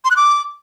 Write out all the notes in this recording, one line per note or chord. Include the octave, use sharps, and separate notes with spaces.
C6
F#6
D6